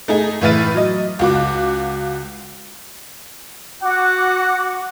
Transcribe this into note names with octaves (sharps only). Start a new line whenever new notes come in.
A3 D#4 G#4
A2 E3 E5 F6 A6 D#7
F#3 D#5
C#2 F#4 D6
F#4 F#5 D6